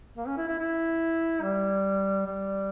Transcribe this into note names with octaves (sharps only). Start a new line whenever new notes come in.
A#3
C#4
E4
E4
E4
G3
G3